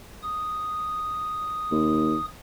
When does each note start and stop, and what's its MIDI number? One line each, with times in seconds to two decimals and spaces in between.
0.23 2.26 87
1.71 2.15 39